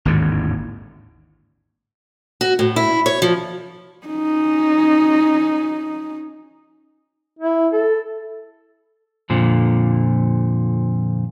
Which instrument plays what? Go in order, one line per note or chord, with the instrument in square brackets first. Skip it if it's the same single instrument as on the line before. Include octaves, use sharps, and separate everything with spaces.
[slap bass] G#1 D#2 A2 D3
[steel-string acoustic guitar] F#4
A2
E4
C#5
F3
[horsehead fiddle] C#4 D#4
[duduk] E4
A4
[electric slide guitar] F2 A#2 D3 F3